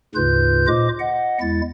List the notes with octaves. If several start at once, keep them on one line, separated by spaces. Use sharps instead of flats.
D2 G#2 C#3 F4 B4 G6
A#2 F4 C5 D#5 D6
D#5 F#5
E2 G#3 E4 A6